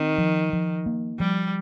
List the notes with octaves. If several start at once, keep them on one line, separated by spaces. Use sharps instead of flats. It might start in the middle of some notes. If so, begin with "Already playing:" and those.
Already playing: D#3 C4
F3
F3
A#3
F3 G3